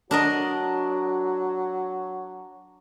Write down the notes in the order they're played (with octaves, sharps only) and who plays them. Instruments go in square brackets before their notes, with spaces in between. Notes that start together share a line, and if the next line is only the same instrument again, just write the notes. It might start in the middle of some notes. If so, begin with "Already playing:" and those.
[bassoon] F#3 [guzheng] D4 A#4 D#5 [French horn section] F#4